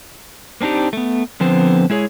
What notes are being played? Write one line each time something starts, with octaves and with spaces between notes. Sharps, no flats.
A#3 C4 D4 D#4 G4
A3 B3
D3 F3 B3 C4 C5
G#3 E4 G#4 C#5